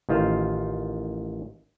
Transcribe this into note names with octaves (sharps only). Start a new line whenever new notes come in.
A1 D#3 F4 C5